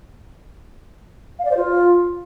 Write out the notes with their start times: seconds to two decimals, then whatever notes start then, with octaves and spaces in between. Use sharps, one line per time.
1.39 F5
1.45 D5
1.51 C5
1.57 F4